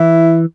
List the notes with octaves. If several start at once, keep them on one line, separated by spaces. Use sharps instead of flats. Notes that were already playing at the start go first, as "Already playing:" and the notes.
Already playing: E3 E4